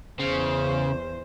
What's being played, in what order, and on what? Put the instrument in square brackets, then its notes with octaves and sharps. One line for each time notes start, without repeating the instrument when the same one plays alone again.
[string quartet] E2 C5 [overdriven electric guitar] C#3